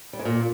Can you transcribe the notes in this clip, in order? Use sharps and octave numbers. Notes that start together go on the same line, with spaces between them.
G3
G#2
A#2